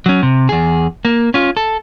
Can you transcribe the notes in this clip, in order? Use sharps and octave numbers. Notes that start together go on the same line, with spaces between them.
F#3 C#4
C3
E2 G#4
A#3
C#4 F4
A4